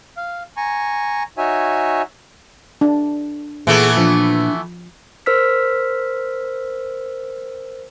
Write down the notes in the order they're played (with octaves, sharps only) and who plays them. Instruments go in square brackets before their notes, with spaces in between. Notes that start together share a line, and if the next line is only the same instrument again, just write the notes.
[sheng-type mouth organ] F5
G#5 A#5 C#6
D#4 F#4 C#5 E5 G#5
[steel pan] D4
[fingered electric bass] A#2 [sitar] E3 A3 B3 [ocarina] G#4
[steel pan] F3 [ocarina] D4
[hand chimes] A#4 C5 E6 F6 B6